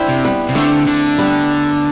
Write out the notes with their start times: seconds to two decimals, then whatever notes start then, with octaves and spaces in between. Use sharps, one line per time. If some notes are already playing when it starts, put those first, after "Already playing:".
Already playing: C4 D4 E4
0.09 C3
0.24 G3 B3
0.49 C3
0.55 D3 A3 C4
0.87 D3
1.18 G3 B3